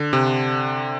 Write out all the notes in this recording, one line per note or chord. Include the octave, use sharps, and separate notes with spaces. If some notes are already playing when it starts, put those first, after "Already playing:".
Already playing: D3
C3